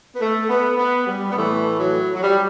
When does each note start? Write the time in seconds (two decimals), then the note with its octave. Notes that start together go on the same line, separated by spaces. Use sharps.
0.14 B3
0.20 A3
0.49 B3
0.77 B3
1.07 G3
1.31 B3
1.35 A2 E3 A3
1.79 F#3
2.13 F#3
2.22 G3